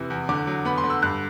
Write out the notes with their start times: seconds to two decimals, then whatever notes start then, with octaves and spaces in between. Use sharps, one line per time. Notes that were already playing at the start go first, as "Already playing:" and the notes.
Already playing: E2 C3 E3
0.10 E2
0.29 D3 D6
0.47 F#3
0.65 B3 B5
0.78 C6
0.84 D3
0.90 E6
1.02 G2 F#6